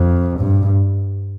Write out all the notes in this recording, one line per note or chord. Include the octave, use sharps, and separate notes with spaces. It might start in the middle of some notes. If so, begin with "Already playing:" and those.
Already playing: F2
G2